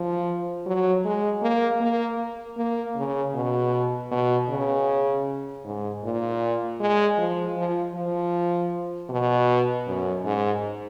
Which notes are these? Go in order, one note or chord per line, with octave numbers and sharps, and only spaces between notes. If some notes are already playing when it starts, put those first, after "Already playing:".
Already playing: F3
F#3
G#3
A#3
A#3
A#3
C#3
B2
B2
C#3
G#2
A#2
G#3
F3
F3
F3
B2
F#2
G#2